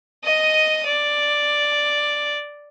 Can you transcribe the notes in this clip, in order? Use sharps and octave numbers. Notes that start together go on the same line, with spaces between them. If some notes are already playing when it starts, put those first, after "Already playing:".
D#5 D#6
D5